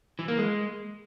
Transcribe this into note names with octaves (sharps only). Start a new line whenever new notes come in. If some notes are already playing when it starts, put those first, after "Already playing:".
E3
A#3
G#3